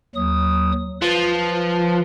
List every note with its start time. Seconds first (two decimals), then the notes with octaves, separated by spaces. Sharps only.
0.15 D#2 F#3 D#6
1.02 F3 B4